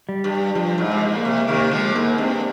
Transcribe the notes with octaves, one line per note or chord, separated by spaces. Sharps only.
G3
G2
G2 F3
G#2
G#3
C3
A#2
A#3
C3
C3 D#3 A#3
D3 F3 G#3
G#2 A#3
G2 C4